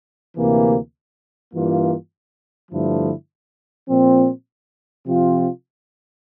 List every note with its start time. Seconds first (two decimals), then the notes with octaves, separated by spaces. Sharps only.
0.36 D2 C3 E3 A#3
1.53 G2 E3 A#3 F4
2.71 G2 D3 F3 A3 E4
3.89 A#2 F3 C4
5.06 C3 F3 C4 F4